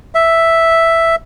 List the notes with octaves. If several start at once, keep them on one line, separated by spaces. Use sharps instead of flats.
E5